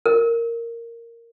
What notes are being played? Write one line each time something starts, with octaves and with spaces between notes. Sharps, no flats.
A#4